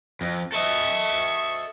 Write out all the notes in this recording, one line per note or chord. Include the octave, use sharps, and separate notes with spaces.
F2
A4 D#5 E5 C#6